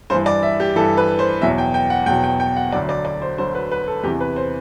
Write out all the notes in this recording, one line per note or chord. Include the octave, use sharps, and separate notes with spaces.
G2 E3 C5
D5
E5
G4
G2 E3 A4
B4
C5
E2 B2 F#3 E5
G5
G5
F#5
E2 B2 F#3 G5
G5
G5
F#5
D2 D3 F#3 D5
D5
D5
C5
D2 D3 F#3 C5
B4
B4
A4
E2 C3 E3 G4
B4
C5